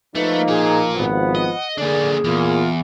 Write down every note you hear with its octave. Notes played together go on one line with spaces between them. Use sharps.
F3 A3 A#3 D#4 B4
F4 G#4 A#4
G#1 F3 B3 F#5
D#5
D3 A#3 D4 G#4 D5
E2 A#2 F4